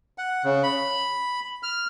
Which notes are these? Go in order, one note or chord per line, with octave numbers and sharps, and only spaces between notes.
F#5
C#3
B5
F6